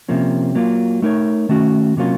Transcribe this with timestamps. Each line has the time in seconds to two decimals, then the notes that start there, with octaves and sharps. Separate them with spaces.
0.09 C3 F3 A#3 C#4
0.55 F#3 A#3 F4
1.02 A3 D#4 A#4 C#5
1.49 D#3 A3 C#4 F#4
1.97 C3 F#3 A#3 C#4 F4